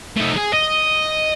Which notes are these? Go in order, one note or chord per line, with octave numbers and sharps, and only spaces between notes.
A3 D#4
G#4
D#5